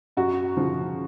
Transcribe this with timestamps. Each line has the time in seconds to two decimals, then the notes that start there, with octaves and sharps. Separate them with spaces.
0.17 F#2 F#4
0.57 C#3 F3